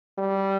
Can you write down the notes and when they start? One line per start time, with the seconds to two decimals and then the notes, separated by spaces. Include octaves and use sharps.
0.18 G3